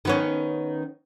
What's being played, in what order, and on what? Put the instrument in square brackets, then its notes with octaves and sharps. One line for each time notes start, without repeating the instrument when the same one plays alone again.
[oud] D#3 B3 C#4